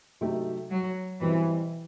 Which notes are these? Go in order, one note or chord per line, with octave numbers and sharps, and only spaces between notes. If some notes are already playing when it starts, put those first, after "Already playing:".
C3 F#3 A3 D#4 G4
F#3
B2 E3 G3 C4 E4 B4